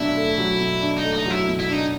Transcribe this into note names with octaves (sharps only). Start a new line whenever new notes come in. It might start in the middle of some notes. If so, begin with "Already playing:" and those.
Already playing: B2 F#3 D4 E4
A3
F#3
B2
D4
D#4
A3
D#4
F#3
E4
B2
E4
D4 D#4